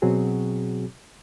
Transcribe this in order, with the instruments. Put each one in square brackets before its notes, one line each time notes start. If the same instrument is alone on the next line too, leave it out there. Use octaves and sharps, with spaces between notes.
[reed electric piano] B2 F#3 C4 F#4 G#4